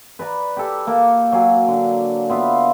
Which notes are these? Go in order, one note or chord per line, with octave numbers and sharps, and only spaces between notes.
B4 D5 A#5
G4 A4
A#3 A4
F#3 F5 G#5
D3
B3 F4 E5 F5